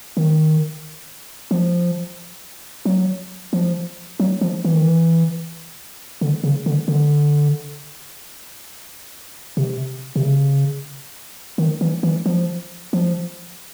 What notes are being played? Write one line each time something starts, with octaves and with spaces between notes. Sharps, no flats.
D#3
F3
F#3
F3
F#3
F3
E3
D#3
E3
D3
C#3
D3
D3
C3
C3
C#3
D#3
E3
E3
F3
F3